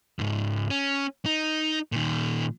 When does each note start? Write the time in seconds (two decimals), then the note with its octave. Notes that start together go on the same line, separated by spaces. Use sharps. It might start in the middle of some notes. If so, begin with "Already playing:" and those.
0.19 C#2 G#2
0.70 C#4
1.25 D#4
1.92 A#2 D#3